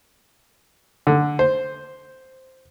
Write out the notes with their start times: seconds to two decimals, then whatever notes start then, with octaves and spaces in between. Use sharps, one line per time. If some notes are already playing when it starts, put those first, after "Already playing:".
1.07 D3
1.39 C5